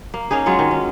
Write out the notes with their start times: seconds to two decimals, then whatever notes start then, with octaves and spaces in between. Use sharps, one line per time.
0.14 A#3
0.31 A#3 C#4 D#4 G#4
0.46 F#3 G#3 F4 C#5
0.59 D#3
0.71 C#4